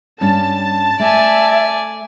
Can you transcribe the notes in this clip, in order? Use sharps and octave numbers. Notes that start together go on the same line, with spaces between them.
G2 G3 C#4 A5
A3 D5 E5 G#5